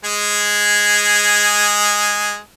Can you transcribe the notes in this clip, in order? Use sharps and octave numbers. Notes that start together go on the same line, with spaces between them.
G#3 G#4